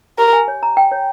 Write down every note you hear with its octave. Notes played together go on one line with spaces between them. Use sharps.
G4 A#4
G#5
C#5
A#5
G5
C#5